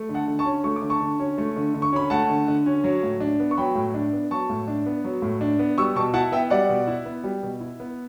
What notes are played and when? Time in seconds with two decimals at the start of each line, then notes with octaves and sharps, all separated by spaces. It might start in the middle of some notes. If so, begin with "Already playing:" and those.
Already playing: A3
0.09 D3
0.14 F#5 A5
0.28 D3
0.39 A5 C#6
0.45 C#4
0.64 A3 C#6
0.76 D6
0.82 D3
0.90 A5 C#6
1.00 D3
1.20 C#4
1.38 A3
1.56 D3
1.74 D3
1.82 C#6
1.92 C#4 B5
2.10 A3 F#5 A5
2.30 D3
2.48 D3
2.66 C#4
2.84 F#3
3.03 A2
3.20 D4
3.40 B3
3.51 C#6
3.57 F#3 G5 B5
3.75 A2
3.94 D4
4.13 B3
4.31 F#3 A5 C#6
4.50 A2
4.68 D4
4.86 B3
5.04 F#3
5.22 A2
5.41 D4
5.59 B3
5.78 G3 C#6 E6
5.96 B2 A5 C#6
6.14 E4 F#5 A5
6.32 B3 E5 G5
6.50 G3 D5 F#5
6.69 B2
6.87 E4
7.05 B3
7.24 G3
7.43 B2
7.60 E4
7.80 B3